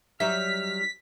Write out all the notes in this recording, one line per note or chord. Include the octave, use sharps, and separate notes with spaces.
F#3 G3 D#4 E5 F6 B6